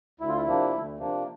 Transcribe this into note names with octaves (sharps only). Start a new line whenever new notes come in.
D2 E4
F4
E4
C3 F3 A#3 D4
D2
C3 F3 A#3 D4